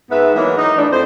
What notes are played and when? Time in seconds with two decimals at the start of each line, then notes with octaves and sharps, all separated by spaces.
0.11 G#2 B3 B4 E5
0.35 E3 F#3 G#3 A#3
0.57 D#4
0.77 E3 A3 D4
0.91 F2 C5